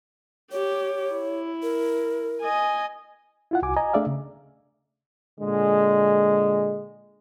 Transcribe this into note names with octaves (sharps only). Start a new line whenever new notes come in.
G4 C#5
E4
A#4
D#5 G#5
E4 F4 F#5
C2 F#4 G#5 D6
D#5 G#5 A#5
A3 D4 G#4 D5 E5 F5
C#3
A#2 D3 G#3